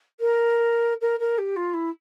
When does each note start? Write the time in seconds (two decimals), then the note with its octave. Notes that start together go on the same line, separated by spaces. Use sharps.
0.20 A#4
1.01 A#4
1.19 A#4
1.38 G4
1.56 F4
1.73 E4